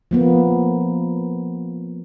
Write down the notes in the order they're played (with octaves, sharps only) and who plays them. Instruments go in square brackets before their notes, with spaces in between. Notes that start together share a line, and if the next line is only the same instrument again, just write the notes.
[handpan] F3 A#3 B3